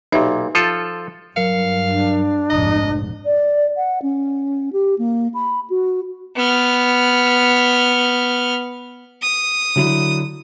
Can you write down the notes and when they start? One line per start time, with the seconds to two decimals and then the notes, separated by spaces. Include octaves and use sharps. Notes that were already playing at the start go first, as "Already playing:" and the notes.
0.12 B1 A#2 D#4 G4 E5
0.55 F3 F4 A4
1.36 G2 F#3 A#4 F5 C#7
1.88 D4
2.50 F1 A#1 G#2 D#5 A#5 D#6
3.26 D5
3.77 F#5
4.02 C#4
4.73 G4
4.99 A#3
5.34 B5
5.70 F#4
6.36 B3 F6
9.22 D#6
9.76 D3 F#3 E4